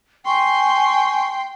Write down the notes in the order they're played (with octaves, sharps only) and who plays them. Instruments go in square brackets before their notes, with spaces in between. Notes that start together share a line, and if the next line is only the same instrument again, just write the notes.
[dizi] G5 [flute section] G#5 C#6 [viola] C6